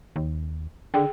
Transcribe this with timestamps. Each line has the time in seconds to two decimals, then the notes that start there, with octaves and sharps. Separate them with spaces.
0.16 D#2
0.94 D3 G#4 G5